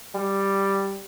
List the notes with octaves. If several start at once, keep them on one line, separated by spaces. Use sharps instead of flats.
G3